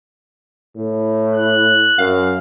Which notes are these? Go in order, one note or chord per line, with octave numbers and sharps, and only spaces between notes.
A2
F#6
F#2 F5